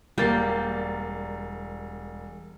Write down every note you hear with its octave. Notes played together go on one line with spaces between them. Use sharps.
E1 G3 A#3 G4 A#4 G5 A6 C7